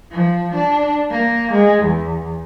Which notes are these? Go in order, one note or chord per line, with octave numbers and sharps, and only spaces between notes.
F3
D4
A#3
G#3
E2